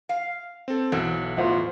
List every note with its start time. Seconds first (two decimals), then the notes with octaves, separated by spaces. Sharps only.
0.09 F5
0.68 C4 A4
0.92 B1 E3 F#3 E4 A4
1.37 E2 A2 F4 C5 E5 F#5